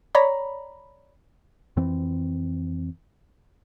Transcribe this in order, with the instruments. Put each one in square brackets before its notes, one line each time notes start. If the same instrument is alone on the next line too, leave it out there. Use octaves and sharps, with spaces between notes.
[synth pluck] C#5 D5 A#5 B5
[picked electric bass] F2 E3 C4